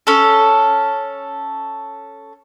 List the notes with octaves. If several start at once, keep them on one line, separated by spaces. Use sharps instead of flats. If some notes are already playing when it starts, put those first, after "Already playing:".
C#4 A4